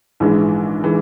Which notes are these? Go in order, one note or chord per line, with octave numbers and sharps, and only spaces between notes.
A#1 G#2 E3 G#3
E3 G#3